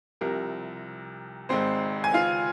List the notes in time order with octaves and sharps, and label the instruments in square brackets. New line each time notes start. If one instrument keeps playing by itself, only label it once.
[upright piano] C2 C3 F3 A#4
G#1 G#2 G#3 C4 C5
G#5
F4 F5